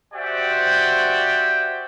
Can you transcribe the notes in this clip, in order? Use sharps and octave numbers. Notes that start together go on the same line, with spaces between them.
F#4 G4 C5 D5 E5 G5